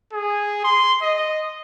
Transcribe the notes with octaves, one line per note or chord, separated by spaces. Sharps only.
G#4
C6
D#5